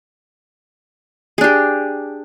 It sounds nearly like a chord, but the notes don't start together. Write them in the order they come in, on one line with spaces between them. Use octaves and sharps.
G#4 D4 G4